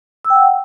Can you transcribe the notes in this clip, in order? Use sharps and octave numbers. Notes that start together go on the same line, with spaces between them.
E6
G5
F#5